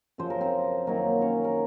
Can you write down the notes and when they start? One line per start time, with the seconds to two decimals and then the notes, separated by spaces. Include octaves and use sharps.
0.18 F#2 C#3 F3 C5
0.30 A#4
0.41 C4 C5
0.87 F#2 D#3 F#3 A#3 A#4
1.22 C#4 C#5
1.44 A#4